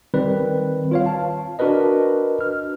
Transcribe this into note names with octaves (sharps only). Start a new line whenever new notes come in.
D#3 G3 C4 B4
F4 C#5 F5
A5
D4 F#4 A#4 B4 D#5
F6